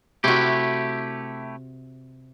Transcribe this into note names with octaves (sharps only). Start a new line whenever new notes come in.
C3 A3 E4 F#4 G4